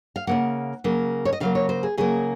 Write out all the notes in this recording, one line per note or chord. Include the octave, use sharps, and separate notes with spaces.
F5
C#3 F#3 A#3 F#5
C#3 F#3 A#3
C#5
D#5
C#3 F#3 A#3 F5
C#5
C5
G#4
C#3 F#3 A#3 G#4